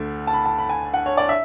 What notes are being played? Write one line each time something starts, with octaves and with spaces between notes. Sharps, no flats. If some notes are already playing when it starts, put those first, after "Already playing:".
Already playing: D2 D3 A3
A5
B5
A5
B5
G#5
F#5
C#5
D5
E5